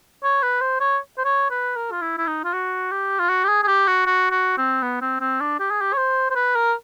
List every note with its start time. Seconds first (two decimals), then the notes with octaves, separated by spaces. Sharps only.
0.24 C#5
0.42 B4
0.61 C5
0.80 C#5
1.18 C5
1.25 C#5
1.51 B4
1.77 A#4
1.92 F4
2.02 E4
2.18 E4
2.27 D#4
2.44 F4
2.54 F#4
2.91 G4
3.19 F4
3.29 F#4
3.44 G4
3.49 G#4
3.63 G#4
3.67 G4
3.87 F#4
4.06 F#4
4.31 F#4
4.58 C4
4.83 B3
5.02 C4
5.20 C4
5.41 D4
5.59 G4
5.71 G#4
5.81 G4
5.93 C#5
5.97 C5
6.30 C5
6.35 B4
6.56 A#4